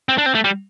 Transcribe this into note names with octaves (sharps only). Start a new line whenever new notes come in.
C4
D4
C4
A3
G3